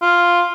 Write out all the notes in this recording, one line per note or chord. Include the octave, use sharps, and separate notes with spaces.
F4